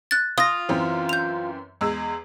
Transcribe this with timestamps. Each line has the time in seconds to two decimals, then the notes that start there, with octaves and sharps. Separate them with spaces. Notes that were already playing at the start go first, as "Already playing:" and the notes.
0.11 F#6 A6
0.38 F4 D#6 A#6
0.69 F#2 E3 C4
1.09 G6 F7
1.81 E2 G#3 E6